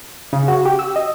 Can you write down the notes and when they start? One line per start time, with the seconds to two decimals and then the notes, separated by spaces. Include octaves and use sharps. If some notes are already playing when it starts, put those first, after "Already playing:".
0.33 C#3
0.48 F#4
0.65 G4
0.79 E6
0.96 D#5